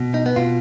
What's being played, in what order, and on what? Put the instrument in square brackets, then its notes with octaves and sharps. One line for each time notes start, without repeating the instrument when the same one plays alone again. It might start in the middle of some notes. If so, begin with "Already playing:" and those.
Already playing: [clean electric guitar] B2
D#4
B3
B2 F4